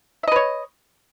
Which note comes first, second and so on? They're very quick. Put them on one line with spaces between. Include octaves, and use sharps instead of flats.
E5 D#5 B4 C#5